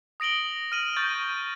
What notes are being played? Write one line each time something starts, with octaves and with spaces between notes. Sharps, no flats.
D#6 A#6 D7 F#7 G7
F6 D#7 F#7
C#6 G6 A6